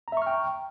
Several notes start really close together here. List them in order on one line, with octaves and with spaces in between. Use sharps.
A#5 E5 C#6 F6 G5